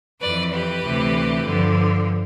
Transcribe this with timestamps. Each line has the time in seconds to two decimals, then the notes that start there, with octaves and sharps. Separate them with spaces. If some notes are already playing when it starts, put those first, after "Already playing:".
0.21 F2 E3 B4 D5
0.52 G4 B4
0.83 D2 C3 E3
1.44 G2 D3 F3